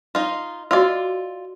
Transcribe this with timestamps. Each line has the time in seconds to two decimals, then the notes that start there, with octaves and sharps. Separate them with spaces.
0.15 D#4 F4
0.71 F4 F#4 D5 D#5 E6